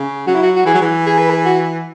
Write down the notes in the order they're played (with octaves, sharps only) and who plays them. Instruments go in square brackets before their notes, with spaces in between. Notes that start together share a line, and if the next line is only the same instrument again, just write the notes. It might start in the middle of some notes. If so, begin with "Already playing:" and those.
Already playing: [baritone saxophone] C#3
[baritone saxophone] F#3 [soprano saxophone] F#4
[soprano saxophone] E4
F#4
F#4
[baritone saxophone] E3 [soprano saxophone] G#4
[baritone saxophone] F#3
E3
[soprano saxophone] G#4
B4
G#4
F#4